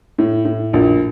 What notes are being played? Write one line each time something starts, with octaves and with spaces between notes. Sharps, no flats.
A2
A2
A#1